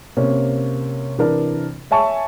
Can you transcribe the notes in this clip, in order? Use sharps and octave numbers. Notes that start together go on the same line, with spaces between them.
C3 A#3 C#4
C3 E3 D4 A#4
C#5 E5 G#5 A5 C#6